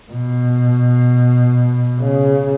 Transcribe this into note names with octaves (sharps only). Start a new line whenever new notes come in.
B2
C#3